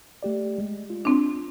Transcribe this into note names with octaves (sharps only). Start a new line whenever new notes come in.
A3 G4 D5
G#3
F4
C4 D4